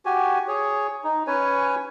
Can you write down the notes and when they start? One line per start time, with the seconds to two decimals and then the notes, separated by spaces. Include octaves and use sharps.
0.06 F#4 G4 G#5
0.48 G#4 C#5
1.04 D#4
1.27 C#4 B4 C#5 G#5